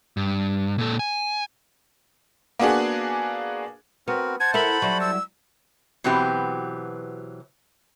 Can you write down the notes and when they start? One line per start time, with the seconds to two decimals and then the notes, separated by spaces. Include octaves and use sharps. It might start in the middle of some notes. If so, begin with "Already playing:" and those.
0.17 G2
0.78 A#2 A4
0.99 G#5
2.59 A#3 B3 D4 F#4 G#4
4.08 B3 C4 F#4 A#4
4.40 C5 F#5 A5 G#6
4.54 E4 A4 A#4 B5
4.82 F#3 G3 E4
5.01 E6
6.04 B2 E3 F#3 C4 G4